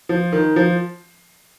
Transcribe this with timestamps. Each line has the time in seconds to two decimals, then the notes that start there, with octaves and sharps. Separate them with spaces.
0.09 F3
0.32 D#3
0.56 F3